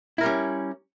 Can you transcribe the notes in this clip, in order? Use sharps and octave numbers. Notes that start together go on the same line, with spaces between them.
G3 C#4 E4 A#4